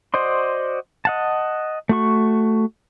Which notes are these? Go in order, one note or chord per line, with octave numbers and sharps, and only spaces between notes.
F#4 C5 D5 D#5 C6
D#5 F#5 A5
A3 F#4 C#6